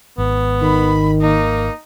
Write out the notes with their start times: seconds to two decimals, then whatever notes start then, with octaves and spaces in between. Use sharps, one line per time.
0.18 G#1 B3
0.62 D#3 B5
1.21 A#3 D#4